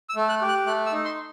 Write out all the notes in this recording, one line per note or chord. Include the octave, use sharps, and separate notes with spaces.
E6
A3
F#6
G4
F#6
A3 F#6
E6
D#4
C6